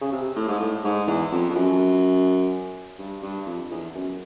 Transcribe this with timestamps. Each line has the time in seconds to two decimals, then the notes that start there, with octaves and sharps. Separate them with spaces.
0.01 C#3
0.12 C3
0.36 A2
0.48 G#2
0.60 A2
0.84 G#2
1.07 E2
1.32 F2
1.50 F2
1.55 F#2
2.98 G2
3.23 G2
3.46 F2
3.71 E2
3.94 F#2